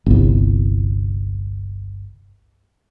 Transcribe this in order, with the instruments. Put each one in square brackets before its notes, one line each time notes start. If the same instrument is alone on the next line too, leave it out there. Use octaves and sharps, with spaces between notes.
[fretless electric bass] G1 C2